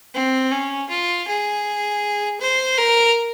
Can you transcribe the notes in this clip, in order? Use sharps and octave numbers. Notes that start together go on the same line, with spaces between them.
C4
C#4
F4
G#4
C5
A#4